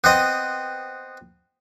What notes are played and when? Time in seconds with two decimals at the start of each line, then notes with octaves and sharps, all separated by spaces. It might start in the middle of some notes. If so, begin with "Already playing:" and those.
0.04 B3 C4 D#5